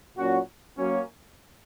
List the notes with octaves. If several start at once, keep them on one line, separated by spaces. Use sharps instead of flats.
A#2 F#3 C#4 F#4
F#3 A#3 C#4